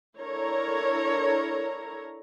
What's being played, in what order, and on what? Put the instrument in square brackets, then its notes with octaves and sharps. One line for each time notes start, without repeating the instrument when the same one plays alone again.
[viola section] D4 E4 A4 A#4 C#5 A#5